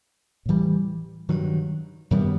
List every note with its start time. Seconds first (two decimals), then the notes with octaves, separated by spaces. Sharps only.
0.46 A2 E3 G3
1.29 G2 D#3 F#3
2.11 F#2 D#3 G3 B3